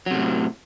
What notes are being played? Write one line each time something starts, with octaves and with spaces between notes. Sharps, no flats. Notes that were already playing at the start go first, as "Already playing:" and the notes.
A2 C3 F#3